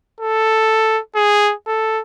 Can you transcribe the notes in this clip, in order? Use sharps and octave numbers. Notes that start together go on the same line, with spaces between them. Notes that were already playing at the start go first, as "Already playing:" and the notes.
A4
G#4
A4